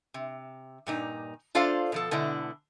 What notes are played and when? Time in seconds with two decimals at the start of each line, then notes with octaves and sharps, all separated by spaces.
0.14 C3
0.87 G2 A#2 D#4
1.55 D4 F4 A4 C5 D5 F5
1.92 B2 F3 A4
2.11 B2 D3 G#3 D4 E4